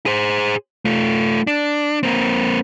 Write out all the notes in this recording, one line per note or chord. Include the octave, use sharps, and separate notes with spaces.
G#4 C5
A3 F4
D4
A#3 C4